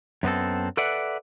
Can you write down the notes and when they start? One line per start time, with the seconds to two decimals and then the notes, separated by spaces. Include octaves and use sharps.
0.23 F#2 B3 C4 A4
0.77 A4 B4 D5 E5 F#5